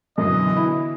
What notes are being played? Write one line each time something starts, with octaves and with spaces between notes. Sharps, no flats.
F#2 B2 D3 E3 D#5
E4